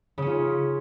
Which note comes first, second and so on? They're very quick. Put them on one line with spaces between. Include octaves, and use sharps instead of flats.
C#3 C#4 F4